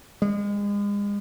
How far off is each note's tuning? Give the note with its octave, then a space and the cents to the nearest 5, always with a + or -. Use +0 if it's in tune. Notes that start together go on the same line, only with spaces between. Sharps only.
G#3 -35